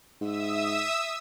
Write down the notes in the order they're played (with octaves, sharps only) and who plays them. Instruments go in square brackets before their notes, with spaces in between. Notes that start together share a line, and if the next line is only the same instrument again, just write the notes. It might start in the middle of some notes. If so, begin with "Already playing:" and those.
[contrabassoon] G#2 [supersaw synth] E5 D#6 E6